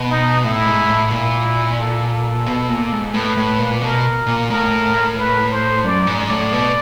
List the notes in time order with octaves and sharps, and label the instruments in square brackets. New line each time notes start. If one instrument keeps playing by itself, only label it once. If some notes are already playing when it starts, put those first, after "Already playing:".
Already playing: [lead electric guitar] B2
[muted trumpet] D#4
[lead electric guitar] A2 [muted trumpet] E4
[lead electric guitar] G#2
A2
[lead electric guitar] A#2 [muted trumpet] E4
[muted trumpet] A4
A4
[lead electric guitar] B2
A#2
G#2
[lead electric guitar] A2 [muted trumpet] B4
[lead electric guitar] A2
A#2
[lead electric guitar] B2 [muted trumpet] A#4
[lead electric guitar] A#2
[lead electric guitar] A2 [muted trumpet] A#4
[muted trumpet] B4
C5
[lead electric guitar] F#2 [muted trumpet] D5
[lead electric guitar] G#2
[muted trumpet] D5
[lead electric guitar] A2
B2